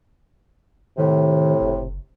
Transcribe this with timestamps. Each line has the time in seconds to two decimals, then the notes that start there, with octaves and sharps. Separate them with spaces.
0.98 A2 C3 D#3
1.61 F#1